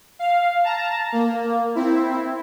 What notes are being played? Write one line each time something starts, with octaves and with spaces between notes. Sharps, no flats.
F5
A5 A#5
A#3
C4 E4